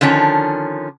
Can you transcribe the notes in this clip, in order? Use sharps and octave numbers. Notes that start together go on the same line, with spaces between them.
D3 D#3 F3 C#4